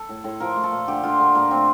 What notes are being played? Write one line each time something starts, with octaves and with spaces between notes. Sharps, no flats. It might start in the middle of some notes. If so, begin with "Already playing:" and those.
Already playing: A4
A2
A2
F3 A#4
A3
A4
A#2
D3 G4
D3 F4
D3
A#2 A#3
A3 C4